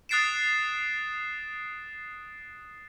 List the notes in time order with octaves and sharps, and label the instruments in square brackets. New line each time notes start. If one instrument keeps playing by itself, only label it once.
[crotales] D#6 F#6 A6 C7 D7 E7